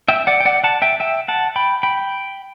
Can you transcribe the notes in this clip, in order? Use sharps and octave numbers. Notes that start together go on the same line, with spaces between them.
E5 G5
D5 F#5
G5
D5 F#5
F#5 A5
E5 G5
E5 G5
F#5 A5
G5 B5
G5 B5